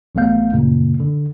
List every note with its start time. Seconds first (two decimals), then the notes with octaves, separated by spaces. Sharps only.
0.15 A1 F#3 A3 B3 F5 G6
0.53 F#2 A#2 C#3 A#3
1.00 D3